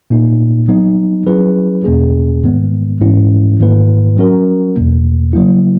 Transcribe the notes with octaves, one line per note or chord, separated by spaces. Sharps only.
A#2 A#3 D#4
F#3 B3 D#4
F#3 C#4 E4 G#4 B4
E2 B2 A#3 C#4 G#4
G#2 D#3 G#3 B3
G#2 E3 G#3 C#4 E4
G#2 D#3 A#3 E4 B4
F#3 C#4 F#4 A#4
E2 B2 A#3
C#3 F#3 A#3 E4